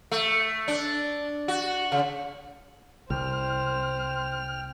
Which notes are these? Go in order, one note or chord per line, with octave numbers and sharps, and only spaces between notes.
A3
D4
F#4
C#3
C2 C5 G5 F6